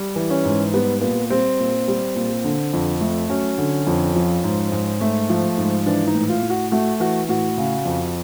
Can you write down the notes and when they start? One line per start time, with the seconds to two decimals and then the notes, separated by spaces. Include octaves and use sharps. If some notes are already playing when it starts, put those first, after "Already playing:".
Already playing: G3
0.16 E3
0.30 C#4
0.45 G#2
0.74 G3 B3
1.01 A#2 B3
1.30 G3 C4
1.59 A#2
1.88 G3
2.15 A#2
2.44 D3
2.73 F2
3.01 A3
3.29 F#3 C#4
3.58 D3
3.87 F2
4.16 F3
4.44 G#2
4.72 G#2
5.01 A3
5.30 F3
5.58 G#2
5.86 E3 D4
6.07 D#4
6.15 A2
6.29 F4
6.43 A2
6.50 F#4
6.71 A3 F#4
7.00 E3 F#4
7.29 A2 F#4
7.58 C#3
7.85 F2